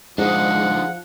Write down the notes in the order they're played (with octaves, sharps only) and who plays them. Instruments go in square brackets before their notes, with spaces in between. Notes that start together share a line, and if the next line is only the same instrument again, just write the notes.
[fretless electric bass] G#2 [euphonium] F3 [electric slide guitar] D4 D#4 G#4 [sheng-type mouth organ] F#5